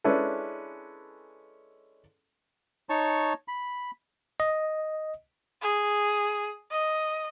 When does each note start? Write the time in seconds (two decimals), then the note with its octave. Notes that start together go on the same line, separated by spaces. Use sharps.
0.04 G#3 C#4 D4 E4 A4 B4
2.89 D#4 C#5 A5 C#6
3.48 B5
4.40 D#5
5.62 G#4
6.71 D#5